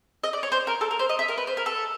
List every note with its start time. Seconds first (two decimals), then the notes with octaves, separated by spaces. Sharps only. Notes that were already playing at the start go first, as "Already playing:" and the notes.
0.24 D#5
0.33 D5
0.43 C#5
0.52 C5
0.67 A#4
0.81 A4
0.91 A#4
0.99 C5
1.09 D#5
1.19 E5
1.28 A#4
1.38 B4
1.47 C5
1.57 A#4
1.66 A4